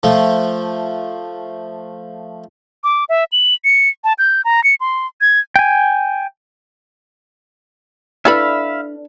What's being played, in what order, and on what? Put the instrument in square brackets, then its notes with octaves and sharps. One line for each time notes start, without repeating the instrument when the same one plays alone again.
[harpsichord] F3 A3
[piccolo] D6
E5
F#7
C#7
A5
G6
A#5
C#7
C6
G#6
[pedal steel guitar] G5 G#5
[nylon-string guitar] D4 [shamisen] E4 A4 B4 [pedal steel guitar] E5 F5 B5